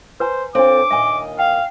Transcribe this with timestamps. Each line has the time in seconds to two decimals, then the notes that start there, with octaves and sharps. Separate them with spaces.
0.20 B4 C5 G#5 A#5
0.55 C4 D4 F4 A4 C#5 D6
0.91 D#2 A#2 D#5 E5 G#5
1.39 F5 G5